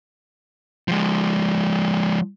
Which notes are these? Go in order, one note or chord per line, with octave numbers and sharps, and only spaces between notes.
F3 G#3